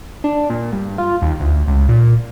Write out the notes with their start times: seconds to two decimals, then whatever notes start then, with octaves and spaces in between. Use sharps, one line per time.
0.24 D4
0.50 A#2
0.72 G2
0.98 F4
1.22 D#2
1.40 D2
1.67 C#2
1.89 A#2